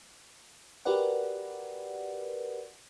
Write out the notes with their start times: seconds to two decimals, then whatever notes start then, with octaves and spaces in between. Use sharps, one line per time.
0.85 F#4 G4 A#4 B4 D5 F#5